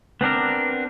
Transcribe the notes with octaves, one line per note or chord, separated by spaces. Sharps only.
B3 C4 D4 A#4